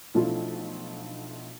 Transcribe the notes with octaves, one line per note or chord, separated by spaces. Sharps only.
B1 F3 A3 D4 E4 F4